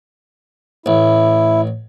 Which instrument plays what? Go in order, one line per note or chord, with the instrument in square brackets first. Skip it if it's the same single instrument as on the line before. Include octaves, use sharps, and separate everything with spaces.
[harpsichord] A1 [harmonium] E4